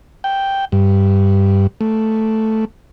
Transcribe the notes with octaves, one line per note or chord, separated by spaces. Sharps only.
G5
G2
A3